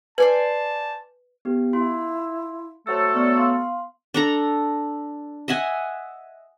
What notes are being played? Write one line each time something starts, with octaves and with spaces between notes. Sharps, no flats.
B4 C5 D5 G#5 A5
B3 G4
E4 F4 C6
F#3 A3 A4 C5 C#5 E6
B3 D5 C#6 E6
F5 C6
D4 A4 A#5
D#5 E5 F#5 G#5